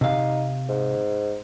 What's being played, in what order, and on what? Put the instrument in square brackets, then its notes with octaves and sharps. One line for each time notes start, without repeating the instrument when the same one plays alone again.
[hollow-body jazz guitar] C3 F5 [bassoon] D#4
[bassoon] G#2